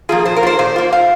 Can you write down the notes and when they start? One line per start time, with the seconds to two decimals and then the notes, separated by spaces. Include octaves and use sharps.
0.09 F3 A#3 F4 G#4
0.25 A#2 C5
0.36 A#4
0.43 A#3 F4 C5
0.59 A#2 C5
0.76 A#3 F4
0.93 F5